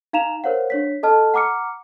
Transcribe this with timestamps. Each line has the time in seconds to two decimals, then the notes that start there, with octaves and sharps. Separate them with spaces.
0.13 D#4 F5 A#5 E7 F7
0.44 A#4 C5 C#5 F5 F#5
0.70 D4 C#5 B6
1.03 A4 D#5 A5 F6
1.34 F#5 A#5 D6 F6 C#7